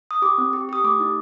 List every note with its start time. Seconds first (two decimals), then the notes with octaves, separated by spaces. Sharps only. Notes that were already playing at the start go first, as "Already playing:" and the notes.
0.11 D#6
0.22 G4 D6
0.38 C4
0.53 G4
0.69 G4 D#6
0.84 A3 D6
1.00 D#4